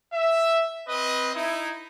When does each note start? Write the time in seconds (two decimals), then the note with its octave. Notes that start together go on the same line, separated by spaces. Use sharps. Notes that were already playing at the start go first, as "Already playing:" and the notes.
0.12 E5
0.88 C4 B4 D#5
1.35 D#4 E4